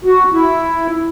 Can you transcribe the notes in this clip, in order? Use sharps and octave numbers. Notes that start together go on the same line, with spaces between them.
F#4
E4